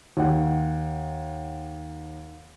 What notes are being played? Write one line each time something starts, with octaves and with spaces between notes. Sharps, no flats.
D#2 F#5